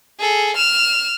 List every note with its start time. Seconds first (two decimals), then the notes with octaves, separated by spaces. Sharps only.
0.19 G#4 A4
0.56 F6 E7